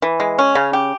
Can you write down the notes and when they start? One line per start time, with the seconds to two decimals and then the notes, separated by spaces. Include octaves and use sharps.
0.02 E3
0.20 G#3
0.39 C#4
0.55 C#3
0.73 G4